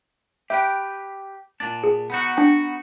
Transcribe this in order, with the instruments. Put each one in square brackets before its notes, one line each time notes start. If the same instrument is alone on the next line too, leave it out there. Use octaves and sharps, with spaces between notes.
[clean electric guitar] G4 B4 G5 [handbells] E5
[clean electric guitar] A#2 D4 [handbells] A6
[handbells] G#4
[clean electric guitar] B3 D#4 F#4
[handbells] D4 G5